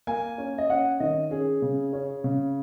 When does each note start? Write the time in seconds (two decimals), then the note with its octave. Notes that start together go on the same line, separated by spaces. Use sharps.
0.07 A#3 G#5
0.38 C#4
0.58 D#5
0.70 C#4 F#5
1.00 D#3 D#5
1.31 C#4 G#4
1.62 C#3
1.93 C#4
2.24 C#3